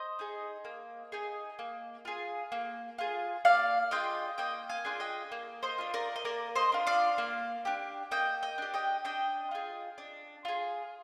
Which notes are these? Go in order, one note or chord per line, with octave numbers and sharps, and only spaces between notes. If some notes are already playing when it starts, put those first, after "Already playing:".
Already playing: C5 D#5
D#4 G#4
A#3
D#4 G#4
A#3
F4 G#4
A#3
F4 G#4
A#3 D5 F5
D4 F4 G#4 D#5 G5
A#3 D#5 G5
F5 G#5
D4 F4 G#4
D#5 G5
A#3
C5 D#5
D4 F4
A#4 D5
D#5
A#3 A#4 D5
C5 D#5
D4 F4
D5 F5
A#3
D4 G4
A#3 D#5 G5
D#5 G5
D4 G4
D#5 G5
D4 D#5 G5
F4 G#4
D4
F4 G#4